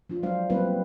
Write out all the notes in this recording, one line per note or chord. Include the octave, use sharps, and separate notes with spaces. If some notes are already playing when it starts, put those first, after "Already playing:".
F3 D4 F4
F#3 G#3 D4 C5 F5
F#3 G3 A#3 C4 E4 B4